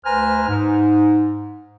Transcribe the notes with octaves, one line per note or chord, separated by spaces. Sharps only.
D2 B4 C5 G#5 A#5 F6
G#2